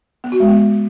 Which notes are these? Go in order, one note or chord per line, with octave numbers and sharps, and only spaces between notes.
B3
F#4
G#3
B3